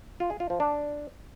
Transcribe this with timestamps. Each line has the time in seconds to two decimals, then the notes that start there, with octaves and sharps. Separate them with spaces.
0.20 F4
0.30 G#4
0.40 F4
0.50 F3
0.60 D4